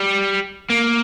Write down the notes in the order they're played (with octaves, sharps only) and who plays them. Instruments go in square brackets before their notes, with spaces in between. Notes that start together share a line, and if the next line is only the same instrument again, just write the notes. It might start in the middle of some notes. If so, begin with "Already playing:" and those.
Already playing: [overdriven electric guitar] G3
A#3